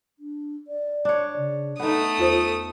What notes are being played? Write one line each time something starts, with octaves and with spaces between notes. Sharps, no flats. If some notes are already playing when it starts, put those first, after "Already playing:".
D4
D5
D4 C#5
C#3
A3 B3 D#4 A4 D#6
E2 F4 C5